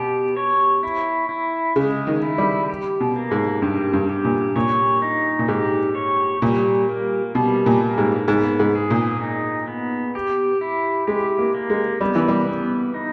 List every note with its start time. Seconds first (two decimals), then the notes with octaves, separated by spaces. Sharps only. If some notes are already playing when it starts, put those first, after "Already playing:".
Already playing: B2 B3 G4
0.37 C#5
0.83 E4
1.29 E4
1.76 C#3 G#3
2.07 D#3
2.22 E4
2.38 G3
2.70 G4
3.00 B2
3.16 A#3
3.31 G#2
3.62 G2 G4
3.93 G2
4.10 G4
4.25 A#2
4.56 A#2 C#5
5.02 D#4
5.39 A#2
5.48 G#2 G4
5.95 C#5
6.42 A#2 G3
6.89 A#3
7.35 B2 G3
7.66 A#2
7.81 A#3
7.98 G#2
8.28 G#2 B3
8.60 G#2
8.75 G#4
8.90 A#2
9.21 D#4
9.68 B3
10.15 G4
10.61 E4
11.07 G#3 G4
11.39 A#3
11.54 A#3
11.70 G#3
12.01 G3 B3
12.15 E3
12.28 G3
12.47 B3
12.94 D#4